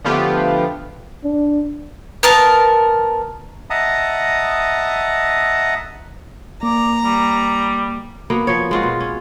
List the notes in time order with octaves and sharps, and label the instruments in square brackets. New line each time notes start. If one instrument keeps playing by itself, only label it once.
[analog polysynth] D3 F3 A3 B3 F4 G4
[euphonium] D4
[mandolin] B3 A#4 A5
[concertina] D#5 E5 F#5 A5 A#5 D#6
[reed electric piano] A#3 [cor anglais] D5 [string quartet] A#5
[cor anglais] G3
[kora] F#3 A#3 B3
F3 C#5
G#3 F4 F#4
B2
C#4